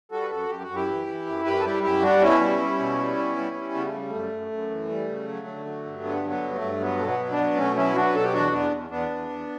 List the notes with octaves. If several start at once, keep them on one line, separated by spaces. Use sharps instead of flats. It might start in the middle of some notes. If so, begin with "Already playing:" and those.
G3 F#4 A4
B4
F#2 F#4 A4
F#2 G4
F#4
F#2
E4 G4
E3
E3
F#2
F#2 G4 B4
A4
G3 E4 G4
F#2 E4 G4
G3 D4 F#4
B2 C#4 E4
G3
G3
B2
G3
B2
G3
G3
C#3 B3
A3
G3
F#2 A3
F#2
F#2
E3
G3
C#3
F#3
D3
F#3
G2
D3 B3
F#3
B3
G2
A3
G2
F#3 B3
B2 A3
B3
F#3
B3 D4
F#3
B2 A3 C#4
F#3 C#4 E4
F#3 D4 F#4
B4
B2 A4
G4
E2 D4 F#4
E2 B3 D4
E2
E2 B3 D4
E2
E2